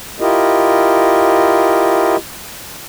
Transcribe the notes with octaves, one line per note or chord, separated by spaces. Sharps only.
E4 F4 G4 A#4 D#5